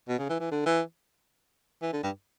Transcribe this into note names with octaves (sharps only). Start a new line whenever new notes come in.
B2
C#3
E3
E3
D3
E3
E3
D3
G2